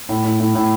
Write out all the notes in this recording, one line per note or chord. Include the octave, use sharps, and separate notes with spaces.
A2
A2
A2
A2